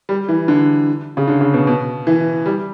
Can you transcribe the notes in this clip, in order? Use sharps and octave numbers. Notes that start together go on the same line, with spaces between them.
G3
E3
D3
C#3
D3
C#3
B2
B2
E3
G3